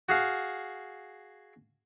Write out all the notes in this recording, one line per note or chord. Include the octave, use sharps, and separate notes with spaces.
F#4 G#4 F5